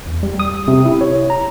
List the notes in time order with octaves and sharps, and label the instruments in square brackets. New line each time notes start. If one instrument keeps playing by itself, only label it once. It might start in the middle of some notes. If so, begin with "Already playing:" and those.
[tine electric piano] E2
G3
D#6
C3
E4
C#5
A#5